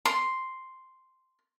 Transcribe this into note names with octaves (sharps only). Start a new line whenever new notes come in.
C6